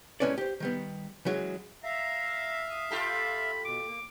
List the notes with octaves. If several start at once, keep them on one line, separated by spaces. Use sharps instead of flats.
A2 G#3 A#3 C#4 B4 D5
G4 C5
D#3 G3 B3
C#3 E3 F#3 G#3
E5 F5 A#5
D#6
F4 G4 A4 B5
B2 D6
A#3